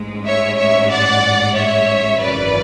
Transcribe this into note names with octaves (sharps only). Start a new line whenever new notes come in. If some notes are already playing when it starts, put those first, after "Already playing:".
Already playing: A1 G#2 G#3
C#5 E5
C#5 E5
D5 F#5
C#5 E5
G#1 F#2 C#3 E3 B4 D5